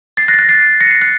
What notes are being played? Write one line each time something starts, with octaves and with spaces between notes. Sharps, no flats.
A6 C7
F#6 A#6
A6
F#6 A#6
A6 C7
A#6 C#7
A6 C7
F#6 A#6